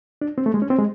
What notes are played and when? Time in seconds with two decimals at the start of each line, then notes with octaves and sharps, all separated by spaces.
0.22 D4
0.38 C4
0.46 A3
0.54 G#3
0.62 C#4
0.70 C4
0.78 G#3